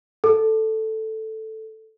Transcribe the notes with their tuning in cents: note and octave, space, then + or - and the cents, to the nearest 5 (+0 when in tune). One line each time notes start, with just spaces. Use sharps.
A4 +0